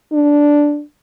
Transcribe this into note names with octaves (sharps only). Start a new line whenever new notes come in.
D4